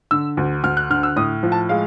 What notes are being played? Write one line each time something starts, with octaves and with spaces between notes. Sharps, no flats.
D3 E6
D2
D2 F6
F#6
D3 F6
E6
A2 D#6
F3
A5
G#3 F5